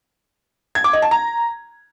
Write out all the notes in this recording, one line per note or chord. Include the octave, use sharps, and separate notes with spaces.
G#6
D6
D#5
A5
A#5